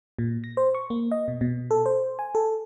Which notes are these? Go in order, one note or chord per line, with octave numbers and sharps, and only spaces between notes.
A#2
A#6
C5
C#6
A#3
D#5
B2
B2
A4
C5
G#5
A4